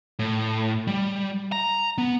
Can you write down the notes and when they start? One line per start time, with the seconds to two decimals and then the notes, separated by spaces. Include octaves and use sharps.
0.19 A2
0.87 G3
1.52 A#5
1.98 B3